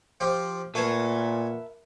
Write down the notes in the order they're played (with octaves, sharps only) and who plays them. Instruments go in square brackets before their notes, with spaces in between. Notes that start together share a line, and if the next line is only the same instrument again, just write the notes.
[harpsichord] F3 G4 F5
[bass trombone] A#2 [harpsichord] F#4 G#5 [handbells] A#4 B4 [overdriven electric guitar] E5 A5